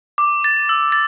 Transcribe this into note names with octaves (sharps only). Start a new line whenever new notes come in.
D6
A6
E6
A6